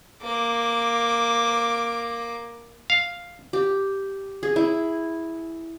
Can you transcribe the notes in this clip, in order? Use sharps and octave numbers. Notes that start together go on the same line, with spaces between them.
A#3 D6
F5
G4
G#4
E4